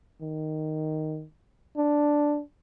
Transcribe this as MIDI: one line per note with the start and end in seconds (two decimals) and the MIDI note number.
0.21 1.25 51
1.77 2.41 62